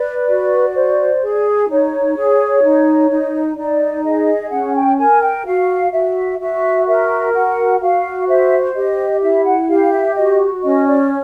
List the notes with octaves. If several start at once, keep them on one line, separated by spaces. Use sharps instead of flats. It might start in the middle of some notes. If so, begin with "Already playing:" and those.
Already playing: B4 D5
F#4
C5
G#4
D#4 C#5
G#4
D#4
D#4
D#4 D5
G#4 D#5
C#4 F#5
G5
A#4 G#5
G5
F#4 F5
F#4 E5
F#4 E5
A#4 E5
F#4 F#5
F#4 F5
C5 E5
G4 D#5
E4 E5
F#5
G4 F5
E5
F#4 D#5
C#4 D#5
D5